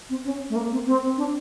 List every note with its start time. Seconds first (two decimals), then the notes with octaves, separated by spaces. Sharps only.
0.09 C4
0.25 C#4
0.50 A3
0.56 A#3
0.72 C4
0.86 C4
1.17 D4